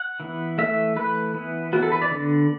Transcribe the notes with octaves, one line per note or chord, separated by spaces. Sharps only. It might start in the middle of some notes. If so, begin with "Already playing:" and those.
Already playing: F#5
E3 B3
E3 A3 E5
E3 A3 B4
E3 B3
E3 B3 F#4
A4
B4
D5
D3 B3